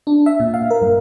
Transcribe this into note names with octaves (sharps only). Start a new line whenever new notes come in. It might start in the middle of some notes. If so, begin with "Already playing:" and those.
D4
E5
A#2
F5
A#4
G2